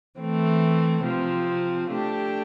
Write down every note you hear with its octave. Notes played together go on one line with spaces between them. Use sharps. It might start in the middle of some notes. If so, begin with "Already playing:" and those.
E3 A3 C4
C3 F3 C4
A3 D4 G4